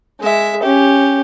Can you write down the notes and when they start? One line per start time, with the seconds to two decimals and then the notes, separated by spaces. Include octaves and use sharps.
0.20 G#3 E5
0.63 C#4 G4